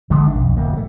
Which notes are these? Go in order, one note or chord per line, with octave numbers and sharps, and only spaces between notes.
D3 G#3 A3
G#1 D3 D4
B1 F2
D1 F2 A#3
F#3 A3